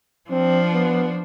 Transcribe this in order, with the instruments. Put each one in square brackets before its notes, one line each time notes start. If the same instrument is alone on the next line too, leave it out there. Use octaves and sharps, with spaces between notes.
[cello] F3 D4 [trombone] C4
[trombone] B3